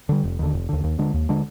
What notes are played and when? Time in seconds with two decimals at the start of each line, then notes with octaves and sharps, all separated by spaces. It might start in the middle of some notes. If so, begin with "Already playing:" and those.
0.09 D3 G3
0.24 F1
0.39 D#2 D3
0.53 F1
0.69 D#2 D3
0.84 D#2
0.99 D3 G#3 D4
1.14 D#2
1.29 D3 G#3 D4